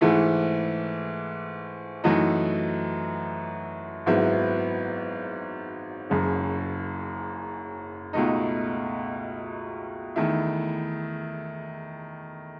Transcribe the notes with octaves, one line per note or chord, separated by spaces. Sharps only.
G#2 E3 A3 E4
F#2 E3 A3 D#4 F#4
G#1 G#2 F#3 B3 E4
F#1 F#2 C#3
C#2 B2 A3 D#4
E2 D#3 A3 E4